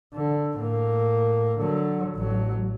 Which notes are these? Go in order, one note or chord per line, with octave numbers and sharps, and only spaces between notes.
D3
A2 A#3
D3 F#3
A1 F#3